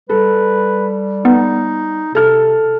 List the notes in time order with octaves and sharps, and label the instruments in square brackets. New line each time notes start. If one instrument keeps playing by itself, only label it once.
[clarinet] G3 [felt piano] A4 [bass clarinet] B4
[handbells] B3 [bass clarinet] D#4
[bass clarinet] C3 [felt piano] A4 F6